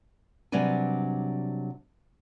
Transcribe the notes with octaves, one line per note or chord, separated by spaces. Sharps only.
C3 F#3 G3 D4 B4 G#5